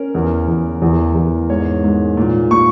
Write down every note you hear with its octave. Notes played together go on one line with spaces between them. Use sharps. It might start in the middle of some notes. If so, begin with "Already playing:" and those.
Already playing: C#4 A#4
E2
E2
E2
E2
G#2 C#5
G#2
A#2
A#2 C#6